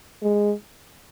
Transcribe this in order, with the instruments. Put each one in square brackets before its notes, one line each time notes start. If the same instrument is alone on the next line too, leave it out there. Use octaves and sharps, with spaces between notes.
[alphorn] G#3